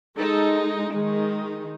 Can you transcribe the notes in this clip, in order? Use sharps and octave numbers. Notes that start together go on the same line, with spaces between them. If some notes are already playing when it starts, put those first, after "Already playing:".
G#3 D#4 A4
D#3 G#3 D#4 G#4